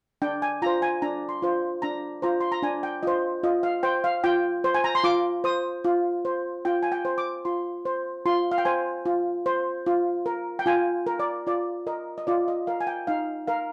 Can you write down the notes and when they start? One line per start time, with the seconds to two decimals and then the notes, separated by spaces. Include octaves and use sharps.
0.22 D4 G5
0.42 G#5
0.62 F4 C5 A#5
0.82 G#5
1.02 D4 A#5
1.29 C6
1.42 F4 C5
1.82 D4 A#5
2.22 F4 C5 A#5
2.41 C6
2.52 A#5
2.62 D4 G#5
2.83 G5
3.03 F4 C5 D#5
3.43 F4 D#5
3.63 F5
3.83 C5 G5
4.04 F5
4.24 F4 G5
4.64 C5
4.74 G#5
4.84 A#5
4.95 C6
5.04 F4 D6
5.44 C5 D#6
5.84 F4
6.25 C5
6.65 F4 G5
6.83 G#5
6.92 G5
7.05 C5
7.18 D6
7.45 F4 C6
7.85 C5
8.26 F4 C6
8.52 F5
8.58 G5
8.65 C5 G#5
9.05 F4
9.46 C5
9.86 F4
10.26 A#4
10.59 G5
10.66 F4 G#5
11.07 A#4
11.19 D5
11.47 F4 D5
11.87 A#4 D#5
12.18 D#5
12.27 F4 D5
12.48 D#5
12.67 A#4 F5
12.80 G#5
12.87 G5
13.07 D#4 F5
13.47 A#4 F5